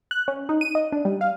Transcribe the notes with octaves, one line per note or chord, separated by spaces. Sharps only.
F#6
C#4
D#4
D#7
D#5
D4
G3
F5